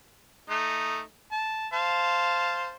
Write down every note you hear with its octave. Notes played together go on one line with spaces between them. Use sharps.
A3 D#4
A5
C5 F5 A5